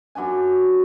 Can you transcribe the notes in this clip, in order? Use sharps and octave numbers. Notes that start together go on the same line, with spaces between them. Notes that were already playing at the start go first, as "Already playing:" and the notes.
F#2 F#3 D4 G#5